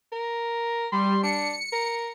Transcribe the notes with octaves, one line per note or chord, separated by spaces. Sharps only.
A#4
G3 C6
D4 C#7
A#4